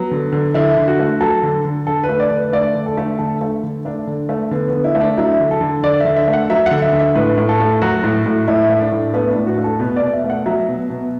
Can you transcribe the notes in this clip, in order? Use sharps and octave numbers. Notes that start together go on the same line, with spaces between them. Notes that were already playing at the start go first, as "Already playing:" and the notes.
Already playing: F#3 B3
D3
D3
D3 E4
D3
F#4
A3
F#3 A4
D3
D3
D3 A4
B4
A3
D5
D3
B4
A3 D5
D3
A4
A3
D3 A4
A3
D3
A3 D4
D3
A3
D3 B3
D3 B3
E4
A3
D4
F#3 E4
D3
A4
D3
D3 D5
D3 E5
E5
A3
F#5
F#3 E5
F#5
D3
E5
D3
E5
A2 B4
A2
A4
A3
F#3 F#4
A2
A2
A2 E4
A3
D4
A2
A3 B3
D4
A2
F#4
A3
A4
B2 B4
D5
B2
E5
A3
F#5
F#3 E5
B2
B2